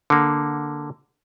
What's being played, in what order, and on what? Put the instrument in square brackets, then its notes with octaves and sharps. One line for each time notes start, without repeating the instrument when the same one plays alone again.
[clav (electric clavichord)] D3 A#3